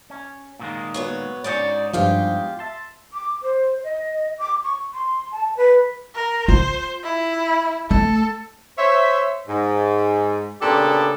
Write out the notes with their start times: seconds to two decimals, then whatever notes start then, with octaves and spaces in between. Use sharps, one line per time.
0.10 C#4
0.59 A#2 D#3 G#3
0.94 F#3 B3 C#5
1.44 D2 G#2 C#4 D#4 C#5 D5 A6
1.93 E2 G2 F3 F4 G4
2.59 E5 A5 C6
3.13 D6
3.43 C5
3.84 D#5
4.39 D6
4.64 C#6
4.94 C6
5.32 A5
5.57 B4
6.15 A#4
6.48 F4 C5
7.04 E4
7.91 A3 A4
8.78 C5 C#5 E5
9.48 G#2
10.61 A#2 C#3 B3 D4 G4 A4